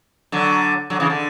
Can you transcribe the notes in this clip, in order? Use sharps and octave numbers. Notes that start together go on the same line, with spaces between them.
D3 F#3
D3 F#3
C#3 E3
D3